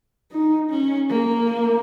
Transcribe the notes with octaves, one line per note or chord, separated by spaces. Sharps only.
D#4
C#4
A#3